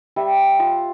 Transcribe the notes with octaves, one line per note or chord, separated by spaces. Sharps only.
G3 E5
F4